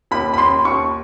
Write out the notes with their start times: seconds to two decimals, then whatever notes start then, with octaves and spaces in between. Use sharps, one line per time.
0.11 D#2 B5
0.34 B5
0.38 D#2 C6
0.65 D#2 C#6